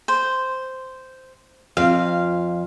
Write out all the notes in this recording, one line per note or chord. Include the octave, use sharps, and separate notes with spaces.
C5
F2 F5